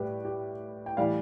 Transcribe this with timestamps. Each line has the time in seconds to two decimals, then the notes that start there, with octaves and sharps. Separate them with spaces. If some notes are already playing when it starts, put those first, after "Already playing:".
Already playing: A2 G3 G4 B4
0.25 G4
0.86 G5
0.97 A2 E3 G3 D5 F5